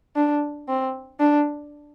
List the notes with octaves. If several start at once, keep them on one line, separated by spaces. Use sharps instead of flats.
D4
C4
D4